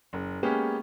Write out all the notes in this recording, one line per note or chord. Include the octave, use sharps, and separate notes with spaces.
F#1
G#3 A#3 B3 C#4 G4 G#4